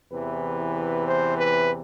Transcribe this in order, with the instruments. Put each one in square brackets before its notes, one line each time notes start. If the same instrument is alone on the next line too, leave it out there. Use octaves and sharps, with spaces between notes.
[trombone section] E2 C3 E3 B4
C5
B4